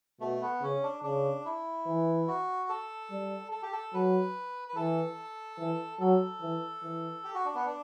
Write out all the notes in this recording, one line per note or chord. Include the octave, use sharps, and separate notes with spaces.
B2 A3
B3
C#3 C#4
D4
C#3 D4
E4
E3
F#4
A4
G3
A4
G4
A4
F#3 B4
B4
E3 A4
E3
F#3 A4
E3
E3
G4
F#4
D4
B3
D4